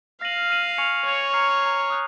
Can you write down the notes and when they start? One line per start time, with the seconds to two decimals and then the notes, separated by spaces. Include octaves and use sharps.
0.21 F5 F6 A#6 D#7 F#7
0.50 F6 A#6 D#7 F#7
0.78 G#5 C#6 G#6 C#7 F7
1.06 C#5 G#5 C#6 G#6 C#7 F7
1.34 A#5 F6 C7
1.62 A#5 F6 C7
1.90 D#6 F#6